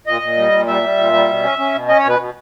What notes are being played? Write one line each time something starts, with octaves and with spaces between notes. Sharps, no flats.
A#2 D#5
A#2
G3
A#2
G3 E5
G3
A#2
G3
B2
C#4
C#4
B2
C#4 D#5
C#5
B2 B4
B2